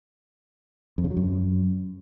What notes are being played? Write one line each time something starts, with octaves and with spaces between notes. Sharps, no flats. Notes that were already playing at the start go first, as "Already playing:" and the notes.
F2
C#3
F#3
F#2